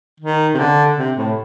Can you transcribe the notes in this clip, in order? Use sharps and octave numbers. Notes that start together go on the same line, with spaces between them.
D#3
C3
D3
C3
A2